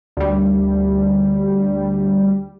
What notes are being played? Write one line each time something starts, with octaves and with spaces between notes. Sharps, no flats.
D2 G3